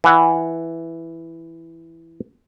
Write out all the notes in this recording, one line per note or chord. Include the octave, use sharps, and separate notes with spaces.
E3 F#5